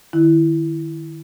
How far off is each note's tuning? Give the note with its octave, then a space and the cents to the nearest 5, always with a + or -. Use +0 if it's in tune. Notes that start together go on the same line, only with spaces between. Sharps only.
D#3 -25 E4 +0